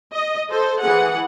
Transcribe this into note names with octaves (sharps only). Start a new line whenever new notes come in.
D#5
A4 C5
E3 G#4 F#5